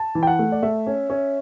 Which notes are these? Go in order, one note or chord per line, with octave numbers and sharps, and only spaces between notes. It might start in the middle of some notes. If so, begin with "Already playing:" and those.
Already playing: A5
E3
G5
F#5
A3
D5
A3 E5
C#4
C#4